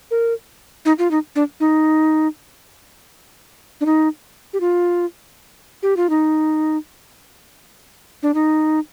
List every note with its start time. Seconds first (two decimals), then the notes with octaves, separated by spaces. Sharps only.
0.11 A#4
0.85 D#4
0.99 F4
1.11 D#4
1.36 D4
1.60 D#4
3.81 D4
3.86 D#4
4.53 G4
4.60 F4
5.83 G4
5.97 F4
6.10 D#4
8.23 D4
8.34 D#4